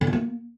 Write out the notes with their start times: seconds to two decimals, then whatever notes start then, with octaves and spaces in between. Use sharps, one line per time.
0.01 D3
0.07 D4
0.13 A#3